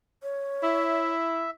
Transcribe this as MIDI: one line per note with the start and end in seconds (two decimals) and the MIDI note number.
0.23 1.12 73
0.63 1.50 64
0.63 1.50 76